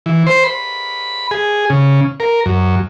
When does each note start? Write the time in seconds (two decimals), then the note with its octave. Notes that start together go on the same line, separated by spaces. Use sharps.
0.06 E3
0.27 C5
0.44 B5
1.31 G#4
1.70 C#3
2.20 A#4
2.46 F#2